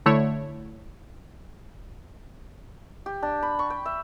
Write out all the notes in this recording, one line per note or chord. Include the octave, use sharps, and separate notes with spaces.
D3 A3 E4 C#5
G4
D4
B5
C#6
G5
E5